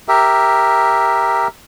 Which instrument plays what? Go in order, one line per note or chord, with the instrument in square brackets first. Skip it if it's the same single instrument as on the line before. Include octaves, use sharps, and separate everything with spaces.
[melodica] G4 A#4 E5